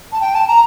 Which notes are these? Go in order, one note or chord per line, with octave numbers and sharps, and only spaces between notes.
A5
G5
A5
A#5